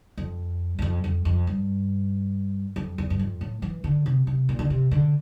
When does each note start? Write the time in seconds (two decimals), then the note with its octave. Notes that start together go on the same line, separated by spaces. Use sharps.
0.17 F2
0.79 E2
0.82 F2
1.04 F2
1.25 F2
1.47 G2
2.76 F2
2.98 E2
3.10 G2
3.19 F2
3.41 A2
3.62 E3
3.84 D3
4.06 C3
4.27 C3
4.49 A#2
4.59 D3
4.70 C3
4.91 D3